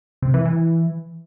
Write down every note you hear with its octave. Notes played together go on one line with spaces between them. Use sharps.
C3
E3
E3